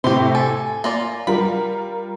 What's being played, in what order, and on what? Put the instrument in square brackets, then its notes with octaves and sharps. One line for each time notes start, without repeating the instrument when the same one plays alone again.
[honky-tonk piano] A2 C3 [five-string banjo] G4 C5
[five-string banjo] A4 [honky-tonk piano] G#5
[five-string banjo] A#3 F4 D5
[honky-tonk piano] G3 F4 A#4 [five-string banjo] B5